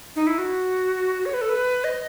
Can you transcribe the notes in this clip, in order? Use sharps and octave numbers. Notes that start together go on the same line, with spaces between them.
D#4
E4
F#4
C#5
B4
A4
B4
D#5